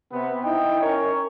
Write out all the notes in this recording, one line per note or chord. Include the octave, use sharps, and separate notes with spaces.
C3 B3
D#4 E4 G5
C#4 A#4 C#5